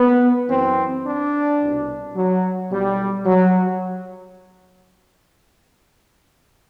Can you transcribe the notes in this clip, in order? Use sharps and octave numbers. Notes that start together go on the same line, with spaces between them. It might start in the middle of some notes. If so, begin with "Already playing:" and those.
Already playing: B3
F#2 E3 C4
D4
C2 B2
F#3
B1 B2 G3
F#3